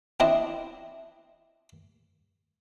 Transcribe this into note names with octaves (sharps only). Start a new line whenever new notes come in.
C4 D4 E4 D#5